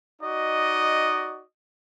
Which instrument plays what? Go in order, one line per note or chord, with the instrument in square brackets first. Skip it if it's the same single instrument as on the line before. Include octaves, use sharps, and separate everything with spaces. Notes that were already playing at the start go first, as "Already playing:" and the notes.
[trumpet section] D#4 F#4 D5 D#5